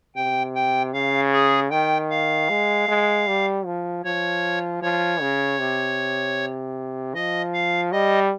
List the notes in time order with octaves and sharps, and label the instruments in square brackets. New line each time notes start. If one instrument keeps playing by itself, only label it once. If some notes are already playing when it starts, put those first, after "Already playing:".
[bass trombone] C3 [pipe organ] G5
[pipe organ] G5
[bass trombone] C#3 [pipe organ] F5
[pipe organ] G#4
[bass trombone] D#3 [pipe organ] G5
[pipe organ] F5
[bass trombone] G#3
G#3
G3
F3
[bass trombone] F3 [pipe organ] C#5
[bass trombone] F3 [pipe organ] C#5
[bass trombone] C#3
C3
[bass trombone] F3 [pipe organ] D#5
[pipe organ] F5
[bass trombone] G3 [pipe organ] D#5